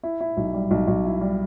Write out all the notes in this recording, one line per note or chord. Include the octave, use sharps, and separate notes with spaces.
E4
E4
B1
G3
B1
B1
E4
G3